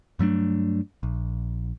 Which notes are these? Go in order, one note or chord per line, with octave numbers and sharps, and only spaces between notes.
G2 F#3 A3 D4
A#1